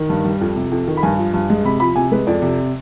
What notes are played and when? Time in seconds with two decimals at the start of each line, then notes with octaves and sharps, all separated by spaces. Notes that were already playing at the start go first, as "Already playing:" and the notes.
Already playing: D#3
0.10 G2
0.24 G3
0.41 F2
0.56 C3
0.71 F2
0.87 D#3
0.97 B5
1.03 G2 G#5
1.18 F3
1.34 G2
1.50 G#3
1.64 C3 B5
1.80 F3 B5
1.96 C3 G#5
2.11 G#3 B4
2.27 F2 D5
2.42 C3